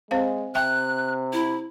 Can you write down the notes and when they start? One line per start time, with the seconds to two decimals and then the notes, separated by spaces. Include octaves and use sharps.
0.11 G#3 C4 C5 F5
0.55 C3 E5 G5 A5 F#6
1.33 E4